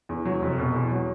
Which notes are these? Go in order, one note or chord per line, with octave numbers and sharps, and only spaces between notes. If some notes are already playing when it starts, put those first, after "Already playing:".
E2
F#3
F1
B2
E2
F#3